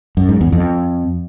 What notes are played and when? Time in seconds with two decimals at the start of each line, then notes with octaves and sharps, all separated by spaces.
0.17 F#2
0.29 G#2
0.41 E2
0.52 F2